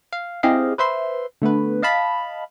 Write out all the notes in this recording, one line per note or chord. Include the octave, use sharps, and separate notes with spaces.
F5
C4 E4 G4 G#4 D#5 F5
B4 C5 E5 C6
D3 A3 B3 B4
D#5 F5 A5 B5